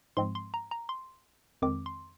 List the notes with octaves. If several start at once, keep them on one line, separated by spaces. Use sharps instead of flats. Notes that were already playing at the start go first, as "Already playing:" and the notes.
G#2 F3 G#3 C4 C6
C6
A#5
A#5
C6
F2 D#3 G#3 C4 D6
C6